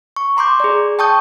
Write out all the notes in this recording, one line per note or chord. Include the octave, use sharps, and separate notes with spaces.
C#6
A#5 C6 D6 G6
G#4 D5
G5 A5 C#6 D#6 G6